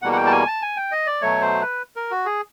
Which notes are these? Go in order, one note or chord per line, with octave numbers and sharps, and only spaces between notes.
E2 B2 G3 A#3 F#5
F#5
G5
A5
G#5
A5
G#5
G5
D#5
D5
B2 F#3 A3 C#5
C5
B4
A#4
F#4
G#4